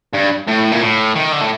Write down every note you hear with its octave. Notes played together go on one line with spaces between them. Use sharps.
G2
A2
A#2
A2
D#3
D3
A2